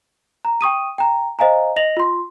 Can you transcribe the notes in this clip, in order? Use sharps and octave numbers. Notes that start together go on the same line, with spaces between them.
A#5
G5 C#6 D#6 D#7
G5 A#5
C5 D#5 F5 G#5 A#5
D#5 A#6 F7 F#7
F4 C6